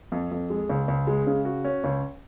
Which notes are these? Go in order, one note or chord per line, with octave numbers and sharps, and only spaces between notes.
F2
F2
G#3
C#2
C#2
G#3
C#3
F#4
C#4
C#2